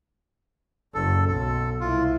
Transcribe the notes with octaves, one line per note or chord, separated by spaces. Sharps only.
F#1 A4
B1 A4
C2 E4 F4